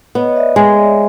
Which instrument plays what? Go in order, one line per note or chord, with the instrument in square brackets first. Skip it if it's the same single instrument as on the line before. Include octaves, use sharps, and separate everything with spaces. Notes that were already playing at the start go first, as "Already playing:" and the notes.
[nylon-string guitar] B3 [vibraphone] C#5 D#5
[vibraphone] D5 E5
[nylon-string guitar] G#3 [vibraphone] C#5 D#5
[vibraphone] C#5 D#5